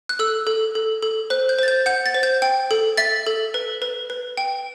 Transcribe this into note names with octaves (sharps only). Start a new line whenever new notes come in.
F#6
A4 E6
A4
A4
A4
C5 F#6
G6
C5 A6
G6
F#5 G6
A6
C5
G6
G5
A4
E5 A6
A4
B4
B4
B4
G5